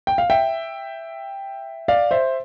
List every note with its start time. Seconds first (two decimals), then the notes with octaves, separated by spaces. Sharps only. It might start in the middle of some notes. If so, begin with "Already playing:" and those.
0.07 G5
0.18 F5
0.30 E5 G5
1.88 D5 F5
2.11 C5 E5